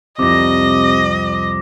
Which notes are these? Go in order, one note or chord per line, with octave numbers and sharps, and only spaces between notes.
C2 F2 C3 D#5 D6 A#6